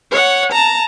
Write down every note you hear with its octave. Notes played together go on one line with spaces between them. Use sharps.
C#5 F#5
A5 A#5